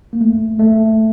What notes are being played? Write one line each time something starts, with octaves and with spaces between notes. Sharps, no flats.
A#3
A3
A3